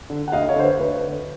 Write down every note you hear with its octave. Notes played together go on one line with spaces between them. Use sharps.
D3
F#5
D2 D#5 F5
C#5 D#5
D3 C5
B4 C#5
D2 B4 C#5
D3